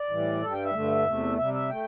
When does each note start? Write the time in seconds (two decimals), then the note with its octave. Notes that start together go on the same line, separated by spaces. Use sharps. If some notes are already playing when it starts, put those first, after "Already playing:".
Already playing: D5
0.10 A2 E3 G3
0.42 G2 G3 A4
0.53 G5
0.64 E5
0.74 G2 D3 A3
1.06 E2 C3 A3
1.38 C3 G3 E5
1.53 E5
1.70 A3 G5